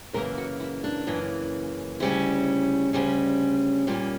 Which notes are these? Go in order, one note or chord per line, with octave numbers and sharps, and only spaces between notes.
F#2 C#3 E3 A#3 A#4
F#4
E4
D4
F#2 C#3 E3 A#3
D2 C#3 G3 C#4 E4
D2 C#3 G3 C#4
A#2 G3 A#3 C#4